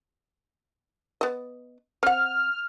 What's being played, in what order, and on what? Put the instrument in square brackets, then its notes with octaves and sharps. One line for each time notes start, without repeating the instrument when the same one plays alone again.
[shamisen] B3 D#5
[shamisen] C4 F#5 [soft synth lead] F6